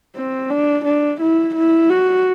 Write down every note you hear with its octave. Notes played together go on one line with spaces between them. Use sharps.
C4
D4
D4
E4
E4
F#4